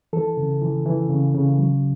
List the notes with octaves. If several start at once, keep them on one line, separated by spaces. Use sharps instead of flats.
E3 A4
C#3
E3
E3
C#3
C#3
F#3